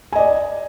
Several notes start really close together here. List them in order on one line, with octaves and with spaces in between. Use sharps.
G#5 D#5 D5